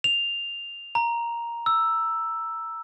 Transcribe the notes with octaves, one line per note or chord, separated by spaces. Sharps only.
F7
A#5
E6